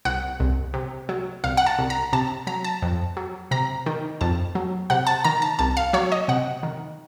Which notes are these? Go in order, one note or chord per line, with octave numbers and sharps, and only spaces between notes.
C2 F#5
C2
C3
F#3
C2 F5
F#5
A5
C2
A#5
C3 A5
F#3 A#5
A5
F2
F#3
C3 A#5
D#3
F2 A5
F#3
C3 F#5
A5
D#3 A#5
A5
C2 A5
F5
F#3 C#5
D#5
C3 F#5
D#3